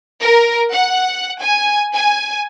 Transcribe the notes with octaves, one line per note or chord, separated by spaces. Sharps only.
A#4
F#5
G#5
G#5